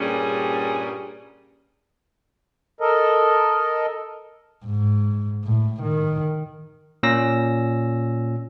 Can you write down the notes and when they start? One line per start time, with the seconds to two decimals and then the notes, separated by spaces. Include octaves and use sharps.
0.01 G2 A#2 G3 C#4 G#4
2.80 A4 A#4 D#5
4.65 G#2
5.44 A2
5.83 D#3
7.03 A#2 C#4 E6 A#6